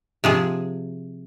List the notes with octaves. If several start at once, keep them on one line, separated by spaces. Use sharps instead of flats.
C3 F3 G#4